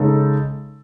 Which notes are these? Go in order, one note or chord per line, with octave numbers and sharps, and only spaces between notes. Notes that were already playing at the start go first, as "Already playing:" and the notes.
Already playing: C#3 G#3 D#4 A4